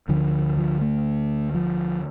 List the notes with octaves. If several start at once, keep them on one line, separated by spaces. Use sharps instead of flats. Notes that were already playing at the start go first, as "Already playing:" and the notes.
D2 D3 F3
F3
A3
F3